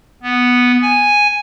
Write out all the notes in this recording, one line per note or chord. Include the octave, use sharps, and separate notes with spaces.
B3
G#5